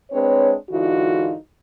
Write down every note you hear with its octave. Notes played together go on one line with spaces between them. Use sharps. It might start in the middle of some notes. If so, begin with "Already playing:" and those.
G#3 C4 D4 B4 C#5
G#2 D3 E3 D#4 F4 F#4